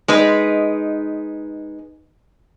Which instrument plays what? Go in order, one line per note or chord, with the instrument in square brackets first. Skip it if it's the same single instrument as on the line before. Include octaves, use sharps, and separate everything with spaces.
[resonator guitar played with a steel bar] G#3 D#4 B4